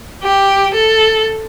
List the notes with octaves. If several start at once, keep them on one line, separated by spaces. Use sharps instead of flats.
G4
A4